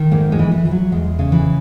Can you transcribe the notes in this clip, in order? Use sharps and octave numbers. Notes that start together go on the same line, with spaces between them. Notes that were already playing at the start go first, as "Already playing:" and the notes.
Already playing: D#3
G#2 A#3
G#3
E3
E3
E3
F#3
E2 G#3
C#3
E3